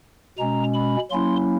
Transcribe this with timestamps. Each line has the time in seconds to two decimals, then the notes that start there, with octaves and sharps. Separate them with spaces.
0.38 B2 G#3 C#4 A#5
0.74 B5
1.10 F#3 A#3 C#4 E4 C6